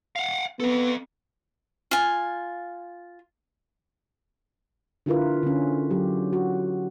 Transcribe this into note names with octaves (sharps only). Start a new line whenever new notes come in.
F5 F#5
B3 C4 A4
F4 G#5
D3 E4 F4 A#4 B4
D3 C#4
F#3 G4
F#4